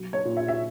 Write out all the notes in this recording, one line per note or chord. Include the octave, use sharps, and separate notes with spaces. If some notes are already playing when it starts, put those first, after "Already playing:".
Already playing: B1
C#5
A#2
E5
E5